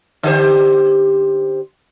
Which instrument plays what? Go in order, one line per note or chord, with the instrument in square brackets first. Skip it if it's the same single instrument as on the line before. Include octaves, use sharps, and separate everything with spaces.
[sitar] D3 G4 C5